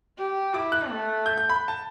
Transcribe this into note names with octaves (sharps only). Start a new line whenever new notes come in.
G4
E4 D6
F#6
A3
G6
G6
B5
A5